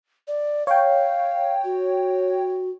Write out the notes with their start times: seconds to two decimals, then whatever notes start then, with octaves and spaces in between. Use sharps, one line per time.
0.28 D5
0.67 C#5 F5 G5
1.64 F#4